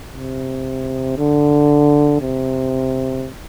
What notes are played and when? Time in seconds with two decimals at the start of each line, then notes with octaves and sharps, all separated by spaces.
0.13 C3
1.17 D3
2.21 C3